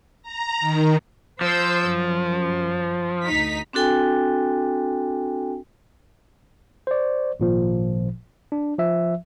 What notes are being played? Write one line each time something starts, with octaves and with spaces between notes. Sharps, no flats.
A#5
D#3
F3 C5 E6 G6
F#2
D2 D#4 B6
C4 D4 F#4 A4 G5 G#5
C5 D5
G#1 A#2 F3
D4
F3 E5